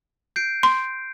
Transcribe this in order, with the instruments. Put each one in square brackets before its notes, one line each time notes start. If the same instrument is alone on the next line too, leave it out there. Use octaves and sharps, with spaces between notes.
[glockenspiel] G6 C7 D7
[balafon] C6